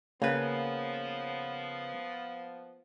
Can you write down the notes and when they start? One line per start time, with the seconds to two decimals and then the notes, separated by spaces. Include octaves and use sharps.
0.22 C#3 F3 A#3 B3 B4